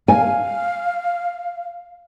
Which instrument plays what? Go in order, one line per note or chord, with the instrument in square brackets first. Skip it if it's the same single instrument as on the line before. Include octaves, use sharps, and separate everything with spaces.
[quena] F5 [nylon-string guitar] G#5